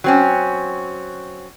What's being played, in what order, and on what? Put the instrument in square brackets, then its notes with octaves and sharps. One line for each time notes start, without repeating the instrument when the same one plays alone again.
[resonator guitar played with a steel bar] F#3 C4 C#4